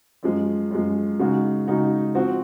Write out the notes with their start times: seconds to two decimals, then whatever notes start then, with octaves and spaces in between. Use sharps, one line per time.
0.23 F#2 F3 G#3
0.71 F#2 F3 G#3
1.19 C#3 G#3 D#4 F#4
1.67 C#3 G#3 D#4 F#4
2.15 F3 C4 F#4